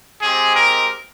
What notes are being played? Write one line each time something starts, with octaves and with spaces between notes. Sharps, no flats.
G#3 C4 G4 G#4
A#4